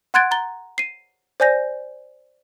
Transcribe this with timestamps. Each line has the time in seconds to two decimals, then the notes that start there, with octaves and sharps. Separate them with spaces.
0.14 F#5 C6 F#6 G#6 A6 D7
0.31 A#5 A6 G7
0.78 C7 D#7
1.40 C5 D5 G#5 G6 A#6